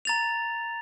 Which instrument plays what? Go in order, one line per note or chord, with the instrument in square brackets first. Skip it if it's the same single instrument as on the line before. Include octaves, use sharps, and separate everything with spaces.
[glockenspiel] A#5 A6 F7